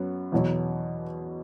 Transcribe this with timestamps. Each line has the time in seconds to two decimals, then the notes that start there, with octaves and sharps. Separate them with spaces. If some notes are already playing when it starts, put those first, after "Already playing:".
Already playing: F#2 F#3 B3
0.32 E2 B2 F#3